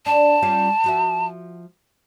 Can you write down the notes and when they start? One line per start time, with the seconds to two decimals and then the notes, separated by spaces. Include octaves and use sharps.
0.06 D4 A5
0.42 G3 C#4 F4
0.84 F3 F#4 E5